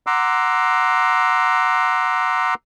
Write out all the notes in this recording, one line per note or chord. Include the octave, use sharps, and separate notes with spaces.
F#5 A#5 C6 D6 E6